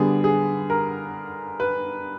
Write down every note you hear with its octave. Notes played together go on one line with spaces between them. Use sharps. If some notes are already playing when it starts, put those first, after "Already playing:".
Already playing: D3 G3 B3 G#4
G#4
A#4
B4